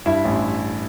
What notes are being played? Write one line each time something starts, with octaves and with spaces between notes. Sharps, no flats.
G2 E4 E5
A1